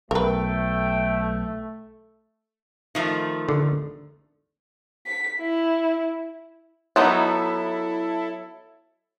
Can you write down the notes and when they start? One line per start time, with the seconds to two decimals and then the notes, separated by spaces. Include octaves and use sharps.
0.11 B1 A3 A#4 B4 G5
2.95 D#3 F3 A3
3.49 D3
5.07 B6
5.40 E4
6.96 F#3 B3 D#4 E4 A4